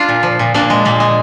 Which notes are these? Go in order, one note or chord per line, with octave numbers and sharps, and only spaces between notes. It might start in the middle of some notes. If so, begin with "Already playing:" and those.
Already playing: D4 F4
A#2
F3
A#2
A#2 A#3 D4
G#3
A#2 A#3
G#3